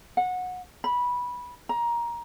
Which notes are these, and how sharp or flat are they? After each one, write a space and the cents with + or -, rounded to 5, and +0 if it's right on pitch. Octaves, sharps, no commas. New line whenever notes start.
F#5 -20
B5 -15
A#5 +15